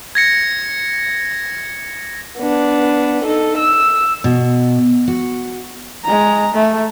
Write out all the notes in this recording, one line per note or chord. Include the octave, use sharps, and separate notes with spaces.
G#6 A#6 C#7
B3 D4
D#4 A4
E6
B2
F#4
G#3 A#5
A3